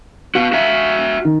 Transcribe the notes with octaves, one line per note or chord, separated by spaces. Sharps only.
F#4 B4 F5
F#4 E5
D#3